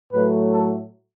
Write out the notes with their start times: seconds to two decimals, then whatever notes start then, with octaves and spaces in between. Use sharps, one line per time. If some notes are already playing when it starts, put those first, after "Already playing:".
0.12 A2 F#3 A3 B4
0.52 A4